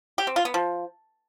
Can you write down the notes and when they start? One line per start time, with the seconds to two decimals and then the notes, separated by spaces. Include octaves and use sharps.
0.18 G4
0.27 C4
0.36 F4
0.45 B3
0.54 F3